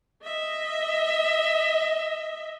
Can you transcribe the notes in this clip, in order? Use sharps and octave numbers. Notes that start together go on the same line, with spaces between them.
D#5 E5